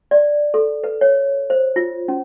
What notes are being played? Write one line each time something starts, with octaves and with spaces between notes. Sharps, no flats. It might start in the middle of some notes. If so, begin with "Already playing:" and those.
D5
A4
B4
C#5
C5
F4
C#4